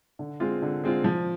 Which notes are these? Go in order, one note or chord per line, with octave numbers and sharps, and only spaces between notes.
D3
G#3 C4 F4
D3
G#3 C4 F4
F3